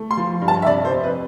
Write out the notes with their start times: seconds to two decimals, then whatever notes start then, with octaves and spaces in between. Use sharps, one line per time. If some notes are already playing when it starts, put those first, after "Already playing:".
Already playing: A3
0.11 C6
0.17 F3
0.42 G2
0.48 A5
0.62 E5
0.66 C3 D5
0.85 C5
0.92 F2
1.04 B4